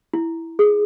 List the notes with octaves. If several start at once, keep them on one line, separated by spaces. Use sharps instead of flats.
E4
G#4